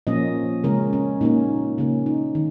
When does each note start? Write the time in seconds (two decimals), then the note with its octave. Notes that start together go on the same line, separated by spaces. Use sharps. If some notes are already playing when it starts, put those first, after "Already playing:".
0.07 A#2 F3 A#3 C#4 D#5
0.64 C#3 G#3 C#4 A#4
0.93 C#4
1.21 A#2 A#3 C#4 D#4
1.78 C#3 A#3 C#4
2.06 D#4
2.35 D#3